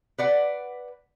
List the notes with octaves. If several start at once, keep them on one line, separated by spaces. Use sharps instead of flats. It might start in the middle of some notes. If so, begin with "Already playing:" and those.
B4 D5 F#5